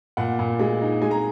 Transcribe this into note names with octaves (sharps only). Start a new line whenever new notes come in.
A#2 F#5
A#2
G#3
D#4
G#3 G#5
A#5